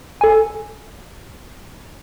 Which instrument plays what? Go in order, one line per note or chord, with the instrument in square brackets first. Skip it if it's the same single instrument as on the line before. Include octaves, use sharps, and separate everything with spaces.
[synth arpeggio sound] A4 G#5